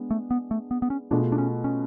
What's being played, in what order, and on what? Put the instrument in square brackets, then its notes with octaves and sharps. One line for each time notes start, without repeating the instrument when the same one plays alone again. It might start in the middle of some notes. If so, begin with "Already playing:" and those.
Already playing: [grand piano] G#3 B3 D4
[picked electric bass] A3
B3
A3
B3
B3
C#4
[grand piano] B2 A3 F4 G#4 [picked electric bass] D4
[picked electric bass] D4
C#4
C#4